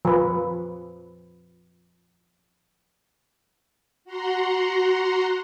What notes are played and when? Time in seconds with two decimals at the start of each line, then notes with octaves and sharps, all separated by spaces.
0.05 F3 B4
4.05 F#4 F#5 A#5 C6